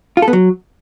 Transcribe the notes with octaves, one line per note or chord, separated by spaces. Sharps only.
F4
A4
B3
F#3